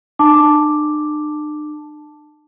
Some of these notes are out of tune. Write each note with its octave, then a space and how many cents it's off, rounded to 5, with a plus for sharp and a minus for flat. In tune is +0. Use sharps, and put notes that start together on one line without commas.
D4 +45 A5 +0 D6 +0